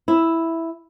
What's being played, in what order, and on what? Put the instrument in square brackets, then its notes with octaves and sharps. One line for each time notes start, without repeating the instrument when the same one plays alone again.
[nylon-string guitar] E4 E5